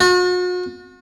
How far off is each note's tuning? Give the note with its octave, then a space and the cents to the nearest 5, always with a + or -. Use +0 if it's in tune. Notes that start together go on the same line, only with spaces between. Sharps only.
F#4 -45